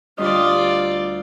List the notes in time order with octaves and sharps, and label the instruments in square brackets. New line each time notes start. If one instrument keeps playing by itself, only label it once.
[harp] D2 G3 D#5 [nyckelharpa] F4 D5